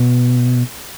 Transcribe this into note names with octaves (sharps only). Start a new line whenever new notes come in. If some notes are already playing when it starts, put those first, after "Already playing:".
Already playing: B2